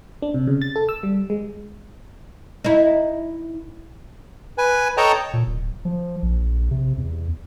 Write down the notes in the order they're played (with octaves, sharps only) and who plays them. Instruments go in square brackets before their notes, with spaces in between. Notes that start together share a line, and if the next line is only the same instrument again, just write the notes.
[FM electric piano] D4
C3
C#3
A6
A4
E6
G3
G#3
[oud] D#4 E4
[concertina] B4 G#5
A4 C#5 D#5 G5 A5 A#5
[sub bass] A#2
D1
F3
A#1
C3
E2